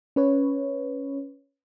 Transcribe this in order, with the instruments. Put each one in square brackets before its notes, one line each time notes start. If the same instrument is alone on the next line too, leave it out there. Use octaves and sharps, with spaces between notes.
[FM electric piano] C#4 B4 C#5